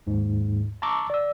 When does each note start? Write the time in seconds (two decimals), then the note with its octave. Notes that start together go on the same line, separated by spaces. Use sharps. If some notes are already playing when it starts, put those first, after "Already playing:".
0.07 D#2 G#2
0.82 A5 A#5 C#6 D6 E6
1.10 D5 E6